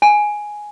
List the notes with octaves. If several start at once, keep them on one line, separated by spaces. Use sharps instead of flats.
G#5